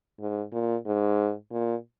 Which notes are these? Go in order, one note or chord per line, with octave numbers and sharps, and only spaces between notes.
G#2
A#2
G#2
A#2